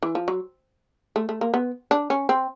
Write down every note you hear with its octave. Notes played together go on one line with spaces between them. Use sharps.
E3
F3
F#3
A3
A3
A#3
B3
D4
C#4
C4